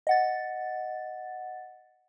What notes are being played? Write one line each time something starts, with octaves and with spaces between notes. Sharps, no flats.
D#5 F#5 A6